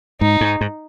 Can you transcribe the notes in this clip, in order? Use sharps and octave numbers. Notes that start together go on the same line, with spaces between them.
G#2 D#4
G#2
G#2